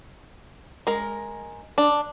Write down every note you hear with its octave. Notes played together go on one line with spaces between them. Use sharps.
G#3 A#4
D4